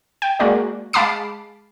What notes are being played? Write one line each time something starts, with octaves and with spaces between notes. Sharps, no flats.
G5
G#3 A#3 F#4 D5
G#3 F5 A5 B5 D6 C7